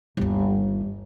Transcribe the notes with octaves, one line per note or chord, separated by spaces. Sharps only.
G1 D#2